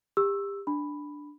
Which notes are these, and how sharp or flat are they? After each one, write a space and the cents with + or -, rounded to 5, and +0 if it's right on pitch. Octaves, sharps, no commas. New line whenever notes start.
G4 +30 E6 +0
D4 +0 B5 +5